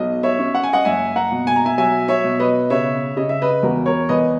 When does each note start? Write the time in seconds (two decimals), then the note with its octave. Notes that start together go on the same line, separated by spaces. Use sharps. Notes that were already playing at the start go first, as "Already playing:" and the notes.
Already playing: B1 D#5
0.23 C#5 E5
0.39 C#4
0.55 F#5
0.63 G#5
0.73 D#5 F#5
0.85 F#1 E5 G#5
1.16 F#5 A#5
1.32 B2
1.47 G#5
1.56 A#5
1.65 E5 G#5
1.78 F#3 E5 G#5
2.08 C#5 E5
2.24 B2
2.39 B4 D#5
2.70 C#3 C#5 E5
3.17 C#3 D#5
3.29 E5
3.42 B4 D#5
3.63 E2 F#4 A#4
3.86 A#4 C#5
4.09 E2 B4 D#5